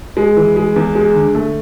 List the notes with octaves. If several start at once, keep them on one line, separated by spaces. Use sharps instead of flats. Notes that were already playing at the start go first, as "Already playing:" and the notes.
G#3
E3
G#3
E2
G#3
D3
A3